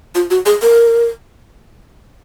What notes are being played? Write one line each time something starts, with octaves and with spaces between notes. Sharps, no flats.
F4
F#4
G#4
A#4